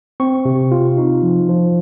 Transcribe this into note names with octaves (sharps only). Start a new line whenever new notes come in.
C4 C#6
C3
F4
D#4
F3
F3